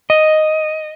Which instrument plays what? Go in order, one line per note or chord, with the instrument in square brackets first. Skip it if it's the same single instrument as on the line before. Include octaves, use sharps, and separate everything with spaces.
[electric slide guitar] D#5